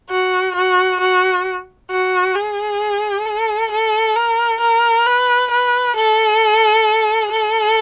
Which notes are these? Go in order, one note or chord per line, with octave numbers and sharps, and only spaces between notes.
F#4
F#4
F#4
F#4
G#4
A4
A4
A#4
A#4
B4
B4
A4
A4